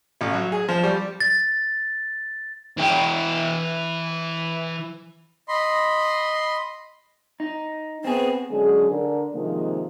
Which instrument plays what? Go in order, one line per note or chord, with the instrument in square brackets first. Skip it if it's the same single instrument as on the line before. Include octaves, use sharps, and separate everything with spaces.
[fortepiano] A1
F#3
G#4
F3
G3
[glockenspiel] A6
[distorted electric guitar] E3 G5
[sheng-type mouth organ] D#5 B5 C6
[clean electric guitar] D#4
[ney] B3 [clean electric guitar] C4 G#4
[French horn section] D3 F#3 G#3 C#4 G#4
D3 D4 A#4
C3 D#3 F3 G#3 A#3